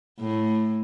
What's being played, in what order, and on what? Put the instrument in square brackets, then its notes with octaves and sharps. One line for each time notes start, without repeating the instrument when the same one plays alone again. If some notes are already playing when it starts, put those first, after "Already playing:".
[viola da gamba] A2